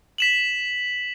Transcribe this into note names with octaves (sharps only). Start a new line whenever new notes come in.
B6 E7 F#7